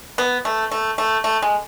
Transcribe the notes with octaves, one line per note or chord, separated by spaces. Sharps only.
B3
A3
A3
A3
A3
G#3